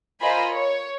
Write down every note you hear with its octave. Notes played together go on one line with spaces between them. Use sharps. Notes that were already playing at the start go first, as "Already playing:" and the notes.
F4 A#4 C5 D#5 G#5 B5
C#5